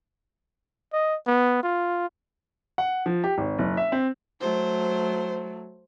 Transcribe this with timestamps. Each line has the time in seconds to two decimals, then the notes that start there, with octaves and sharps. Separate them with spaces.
0.93 D#5
1.27 B3
1.63 F4
2.78 F#5
3.06 F3
3.24 G4
3.38 G#1
3.58 F#1
3.77 E5
3.92 C4
4.41 F#3 A3 C5